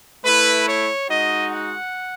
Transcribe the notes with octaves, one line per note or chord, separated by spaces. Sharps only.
A3 E4 B4
C#5
G#3 D#4 F#4 D#5
F#5